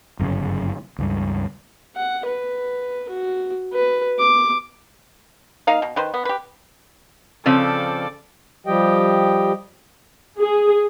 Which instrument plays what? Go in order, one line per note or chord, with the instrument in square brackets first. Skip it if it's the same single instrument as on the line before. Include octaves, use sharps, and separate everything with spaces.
[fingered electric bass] G1 F#2 A#2 C#3
C#2 G2
[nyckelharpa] F#5
B4
F#4
B4
D6
[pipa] A#3 D#4 F5
B2
D#3 B4 C5
B3
G4 B4
[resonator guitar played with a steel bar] C#3 F3 C4 [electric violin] A4 D5
[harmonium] F3 G3 G4 D#5 G5
[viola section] G#4